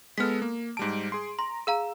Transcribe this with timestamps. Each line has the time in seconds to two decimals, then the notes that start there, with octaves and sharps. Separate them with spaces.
0.18 G#3 B3 A4 F6 B6
0.42 A#3
0.77 G#2 G3 A5 D7
1.12 G#4 C6
1.39 A#5 C6
1.67 G#4 F5 A#5 E6